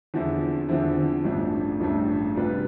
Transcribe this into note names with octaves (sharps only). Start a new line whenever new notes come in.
E2 D3 F3 C4 E4
E2 D3 F3 C4 E4
A1 G2 F3 A3 D4
A1 G2 F3 A3 D4
C3 G3 D4 F4 B4